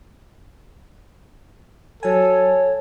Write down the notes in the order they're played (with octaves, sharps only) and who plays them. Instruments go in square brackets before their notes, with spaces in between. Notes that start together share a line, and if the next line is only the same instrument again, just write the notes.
[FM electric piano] F#3 G#5 [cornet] A4 [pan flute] C#5